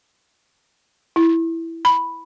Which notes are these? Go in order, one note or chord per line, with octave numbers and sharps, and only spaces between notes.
E4
B5